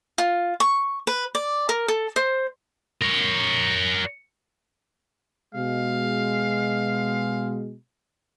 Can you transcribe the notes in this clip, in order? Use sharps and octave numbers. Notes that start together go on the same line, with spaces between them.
F4
C#6
B4
D5
A#4
A4
C5
A#4 C#5
B2 G#3 F5